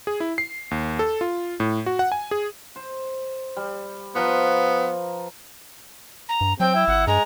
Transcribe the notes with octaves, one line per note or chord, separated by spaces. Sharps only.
G#4
E4
C7
D#2
A4
F4
A2
F#4
F#5
G#5
G#4
C5
G3
F3 B3 B4 A#5
A#5
G2
F#3 C4 G5
E4
G#1 F#5
G2 G#3 A#5